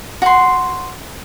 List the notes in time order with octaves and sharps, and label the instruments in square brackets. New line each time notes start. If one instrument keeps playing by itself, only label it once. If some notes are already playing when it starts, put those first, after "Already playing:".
[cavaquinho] F#4 C6